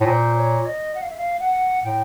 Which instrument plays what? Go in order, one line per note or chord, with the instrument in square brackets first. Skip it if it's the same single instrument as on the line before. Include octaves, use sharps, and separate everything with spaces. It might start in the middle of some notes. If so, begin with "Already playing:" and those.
[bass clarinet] A2
[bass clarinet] A#2 [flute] C5
[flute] C#5
D#5
F#5
F5
E5
F5
F#5
[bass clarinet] A2 [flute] G5